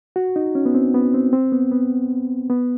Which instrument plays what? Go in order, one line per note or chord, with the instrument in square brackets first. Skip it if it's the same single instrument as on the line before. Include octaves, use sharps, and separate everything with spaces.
[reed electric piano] F#4
D#4
C#4
B3
C4
B3
C4
C4
B3
B3
B3